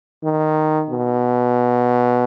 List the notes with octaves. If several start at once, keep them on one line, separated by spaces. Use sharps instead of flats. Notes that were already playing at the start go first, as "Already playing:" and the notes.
D#3
B2